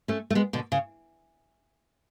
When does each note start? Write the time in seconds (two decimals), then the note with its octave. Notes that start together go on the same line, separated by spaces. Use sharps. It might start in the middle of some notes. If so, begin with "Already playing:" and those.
0.08 A3 C#4
0.30 A3
0.35 G#3 B3
0.53 B2 D3
0.72 C#3